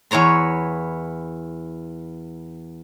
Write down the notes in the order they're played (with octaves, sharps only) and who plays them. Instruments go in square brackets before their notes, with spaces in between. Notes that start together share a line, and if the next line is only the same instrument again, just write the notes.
[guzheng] E2 B4 C#5 A#5 C6